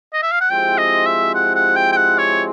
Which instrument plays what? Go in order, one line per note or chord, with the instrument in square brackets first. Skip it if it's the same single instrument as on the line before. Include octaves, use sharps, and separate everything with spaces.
[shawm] D#5
E5
F5
F#5
[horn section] F3 G#3 C4 E4 G4 [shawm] G5
[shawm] D#5
E5
F#5
F#5
G5
G5
F#5
C#5